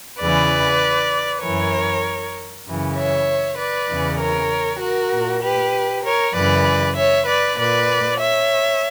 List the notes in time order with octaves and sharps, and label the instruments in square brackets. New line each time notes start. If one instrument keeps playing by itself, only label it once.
[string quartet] E2 C#3 E3 B4 D5
F#2 E3 A#4 C#5
F#2 C#3 E3
C#5 E5
B4 D5
E2 C#3 E3
A#4 C#5
F#4 A#4
A#2
G4 B4
A#4 C#5
F#2 C#3 E3 B4 D5
C#5 E5
B4 D5
A#2 B4 D5
C#5 E5